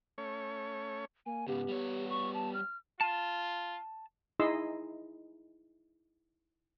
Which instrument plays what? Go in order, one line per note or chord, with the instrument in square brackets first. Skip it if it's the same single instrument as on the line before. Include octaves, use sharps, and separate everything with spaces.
[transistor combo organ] A3 C#4 C#5
[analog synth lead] A#3 [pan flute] G#5
[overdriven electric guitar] G#2 C#3 [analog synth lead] B3 [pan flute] G4
[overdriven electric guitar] G3 C#5
[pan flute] C#6
A5
F6
[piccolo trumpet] F4 [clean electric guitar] A5
[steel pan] D#4 E4 G#4 D#5 C6 E6